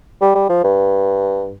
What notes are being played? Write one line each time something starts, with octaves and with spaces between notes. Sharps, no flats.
G3
G3
F3
G2